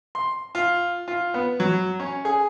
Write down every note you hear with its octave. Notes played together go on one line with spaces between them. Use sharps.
C6
F4
F4
B3
F#3
C#4
G#4